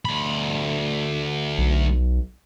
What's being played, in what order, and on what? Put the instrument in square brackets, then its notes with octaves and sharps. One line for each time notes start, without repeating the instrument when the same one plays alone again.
[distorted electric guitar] D2 B5
[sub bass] B1